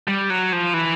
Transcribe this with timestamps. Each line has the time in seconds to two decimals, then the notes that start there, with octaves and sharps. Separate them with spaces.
0.08 G3
0.30 F#3
0.53 F3
0.74 E3